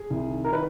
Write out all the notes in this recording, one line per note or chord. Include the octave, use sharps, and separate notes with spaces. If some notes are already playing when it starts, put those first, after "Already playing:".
Already playing: G#4
C2
D#3
D#3 A#4
B4